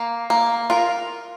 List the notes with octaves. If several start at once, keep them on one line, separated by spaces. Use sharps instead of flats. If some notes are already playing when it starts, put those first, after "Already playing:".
Already playing: A#3
A#3
F4 A#4